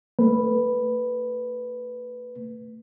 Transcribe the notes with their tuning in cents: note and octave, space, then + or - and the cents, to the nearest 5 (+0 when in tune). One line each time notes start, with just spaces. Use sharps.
A3 +35 B4 +0